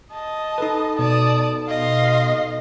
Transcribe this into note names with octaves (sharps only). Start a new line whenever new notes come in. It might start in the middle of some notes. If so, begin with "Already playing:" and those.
D#5 A5
D#4 A4 B4
B2 D5 A5 D#6
D#5 F5 C6